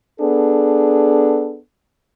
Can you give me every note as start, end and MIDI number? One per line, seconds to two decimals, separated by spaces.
0.20 1.58 59
0.20 1.58 62
0.20 1.58 68
0.20 1.58 69